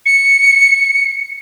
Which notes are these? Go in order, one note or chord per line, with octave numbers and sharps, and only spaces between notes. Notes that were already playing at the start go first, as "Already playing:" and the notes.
C#7